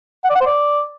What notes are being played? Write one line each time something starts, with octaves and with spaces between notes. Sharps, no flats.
F#5
D5
F#5
C5
D5